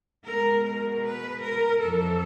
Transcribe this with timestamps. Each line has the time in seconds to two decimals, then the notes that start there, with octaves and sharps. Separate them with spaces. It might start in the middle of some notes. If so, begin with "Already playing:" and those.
0.25 B2 G#3 A#4
0.65 A#4
1.04 B4
1.43 A#4
1.82 F2 C3 E3 A4